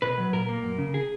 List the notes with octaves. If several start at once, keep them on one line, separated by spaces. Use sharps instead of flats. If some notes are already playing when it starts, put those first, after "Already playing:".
B2 B4
F#3
A#2 A#4
A#3
F#2
C#3
G#4